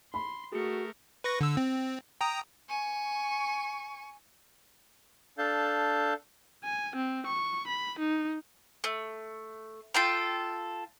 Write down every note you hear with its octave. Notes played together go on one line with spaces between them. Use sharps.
B5 C6
A3 F#4 G#4 A#4 C#7
B4 C#6 A#6
D3 E6
C4
G5 A#5 D#6
G#5 C#6
D4 A4 F5 A5 G6
G#5
C4
C#6
B5
D#4
A3
F4 A4 G5